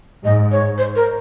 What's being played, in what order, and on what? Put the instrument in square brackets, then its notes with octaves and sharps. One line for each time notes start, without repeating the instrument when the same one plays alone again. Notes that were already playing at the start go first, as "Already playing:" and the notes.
[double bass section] G#2 [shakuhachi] D#5
[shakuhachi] C#5
C5
A#4